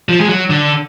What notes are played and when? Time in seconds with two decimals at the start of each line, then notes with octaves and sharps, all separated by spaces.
0.09 F3
0.20 G#3
0.29 F#3
0.50 D3